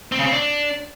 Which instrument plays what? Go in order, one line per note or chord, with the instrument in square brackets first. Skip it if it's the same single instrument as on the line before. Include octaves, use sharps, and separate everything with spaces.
[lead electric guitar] C4
C#3
C4
D4